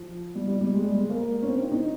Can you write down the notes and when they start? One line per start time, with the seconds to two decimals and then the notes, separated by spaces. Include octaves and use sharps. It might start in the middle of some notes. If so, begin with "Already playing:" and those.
Already playing: F3
0.35 G3
0.48 G3
0.61 G3
0.73 G#3
0.84 G3
0.95 G#3
1.10 A#3
1.42 C#4
1.47 C4
1.60 D#4
1.72 D#4